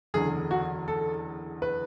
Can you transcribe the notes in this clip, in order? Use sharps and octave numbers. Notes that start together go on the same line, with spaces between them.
F#1 E2 D3 G#4
F#4
A4
B4